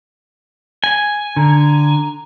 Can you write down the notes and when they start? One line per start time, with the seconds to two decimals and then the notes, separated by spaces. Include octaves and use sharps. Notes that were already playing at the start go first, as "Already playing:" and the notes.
0.84 G#5
1.37 D3 A#5